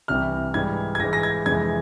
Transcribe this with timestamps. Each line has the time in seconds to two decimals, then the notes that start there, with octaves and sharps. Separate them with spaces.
0.08 C2 C3 E3 G3 F6
0.54 G#2 E3 G3 G#6
0.95 G#6
1.00 G#2 E3 G#3 A#6
1.13 A#6
1.23 G#6
1.46 F2 C3 E3 G#3 G#6